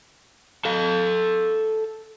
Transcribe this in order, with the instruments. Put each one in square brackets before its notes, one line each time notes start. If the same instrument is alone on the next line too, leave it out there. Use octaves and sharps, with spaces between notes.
[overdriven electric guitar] A4 F5